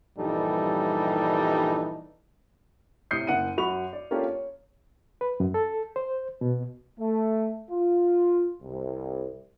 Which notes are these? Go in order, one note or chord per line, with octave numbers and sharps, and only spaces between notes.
A#1 G2 E3 G3 D#4 A4
A2 C3 D#6 G6 C7 C#7
F#1 F#5 C#7 D#7
F#2 F#4 B5 C#6 F7
D5
A#3 C#4 D4 F4 G4 A4
C#5
B4
F#2
A4
C5
B2
A3
F4
C2